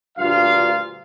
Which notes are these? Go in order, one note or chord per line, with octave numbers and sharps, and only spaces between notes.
D2 G2 A#2 F4 F5